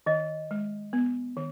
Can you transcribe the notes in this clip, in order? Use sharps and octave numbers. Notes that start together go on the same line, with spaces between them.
D#3 D#5
G#3
B3
D#3